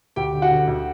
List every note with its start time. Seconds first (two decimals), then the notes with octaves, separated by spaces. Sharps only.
0.16 D2 G4 G5
0.33 D3
0.42 F#4 F#5
0.51 D3
0.67 D2